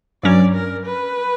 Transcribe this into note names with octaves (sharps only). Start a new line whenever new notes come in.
G2 F#3 C#4 D5
A#4
B4